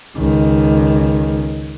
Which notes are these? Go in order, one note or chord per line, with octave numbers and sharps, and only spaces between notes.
C#2 D#3